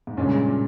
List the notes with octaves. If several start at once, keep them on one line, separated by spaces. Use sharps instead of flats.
G#2
G2 A#2 C#3 G#3 C#4
A#2